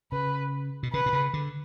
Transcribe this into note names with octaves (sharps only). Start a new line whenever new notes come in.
C#3 B4
B2
C#3 B4
B2
C#3
D3